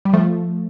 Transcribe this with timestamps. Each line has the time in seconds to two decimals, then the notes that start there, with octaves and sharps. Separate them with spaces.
0.05 G3
0.13 F3 A3